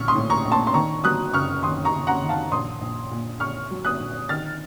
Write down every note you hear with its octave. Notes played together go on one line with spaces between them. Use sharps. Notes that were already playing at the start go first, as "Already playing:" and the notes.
Already playing: A#1 C#6 F6
C6 D#6
A2
A#5 C#6
A#1
A5 C6
C6
D#3 A#5 C#6
F#3 D#6 F#6
F#1 C#6 F6
D#3 C6 D#6
A#5 C#6
F#1
F#5 A#5
D#3
F5 A5
A#1 C6 D#6
A#1
A#2
A#2 C#6 F6
F#3
D#6 F#6
A#1
D#3 F6 A6